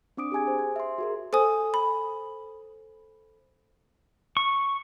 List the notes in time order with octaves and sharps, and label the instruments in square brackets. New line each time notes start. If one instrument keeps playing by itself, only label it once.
[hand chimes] C4 D4 D6 D#6 D7
G4 G#4 G#5 G#6
C5
G#6
E5 C6
F#4 G#4 A#4
[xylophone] A4 C5 G#5 D#6
B5
[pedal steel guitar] C#6